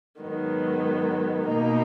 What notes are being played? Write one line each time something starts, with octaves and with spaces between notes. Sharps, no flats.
G#2 D#3 F#3 B3
B2 A#3 D#4